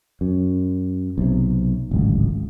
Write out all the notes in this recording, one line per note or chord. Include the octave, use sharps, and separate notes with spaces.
F#2
B1 C3
D1 G#1 C#2